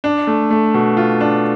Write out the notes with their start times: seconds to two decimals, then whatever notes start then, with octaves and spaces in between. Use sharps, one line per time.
0.04 D4
0.27 A3
0.50 A3
0.74 B2
0.97 F4
1.20 D4